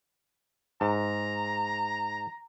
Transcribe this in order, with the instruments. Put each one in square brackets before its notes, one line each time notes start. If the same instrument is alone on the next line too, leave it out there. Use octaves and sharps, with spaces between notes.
[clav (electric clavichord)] G#2 [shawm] A#5